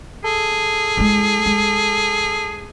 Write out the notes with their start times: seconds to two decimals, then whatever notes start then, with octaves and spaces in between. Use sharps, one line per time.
0.25 G#4 A4
0.97 G#3 E4
1.46 G#3